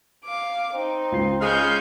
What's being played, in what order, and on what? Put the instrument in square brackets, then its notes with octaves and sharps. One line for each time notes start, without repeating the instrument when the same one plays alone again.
[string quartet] F5 D6
[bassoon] C4 [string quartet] D#4
[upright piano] C#2 C7
[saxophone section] C#3 G#3 [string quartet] F5 C#6 G6